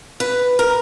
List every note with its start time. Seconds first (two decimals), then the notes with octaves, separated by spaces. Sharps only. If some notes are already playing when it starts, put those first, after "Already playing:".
0.20 B4
0.59 A#4